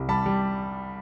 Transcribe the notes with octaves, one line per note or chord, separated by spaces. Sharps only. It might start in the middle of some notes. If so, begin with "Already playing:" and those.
Already playing: C2
G3 A5 B5
G3